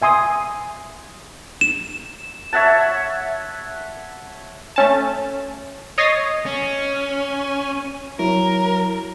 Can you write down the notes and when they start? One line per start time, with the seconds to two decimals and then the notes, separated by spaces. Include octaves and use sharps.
0.02 E5 G#5 C6 D#6
1.61 E7
2.53 C#5 E5 F#5 A5
4.76 A3 C#4 A5
5.98 C#5 D#5 D#6 A6 A#6 C7
6.46 C#4
8.19 F#3 E4 A#4